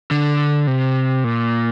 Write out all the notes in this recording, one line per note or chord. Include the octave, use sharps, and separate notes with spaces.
D3
C3
A#2